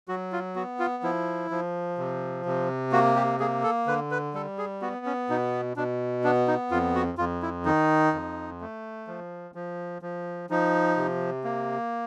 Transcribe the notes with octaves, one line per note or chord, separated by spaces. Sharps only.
F#3 F#4
F4
B3 F#4
F4
F3 E4
F3
C3
C3
A#3 F#4
G4
A#3 G#4
A4
D3 B4
B4
G3 A4
G#4
B3 F#4
C#4
B2 D#4
B2 D4
B3 D4
D#4
F2 F4
F#4
F2 F4
E4
D#3 D#4
F2
A3
F3
F3
F3
F3 D#4
C3
A#3